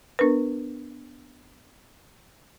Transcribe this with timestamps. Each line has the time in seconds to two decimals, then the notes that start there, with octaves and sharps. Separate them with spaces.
0.19 B3 D4 A#4 B4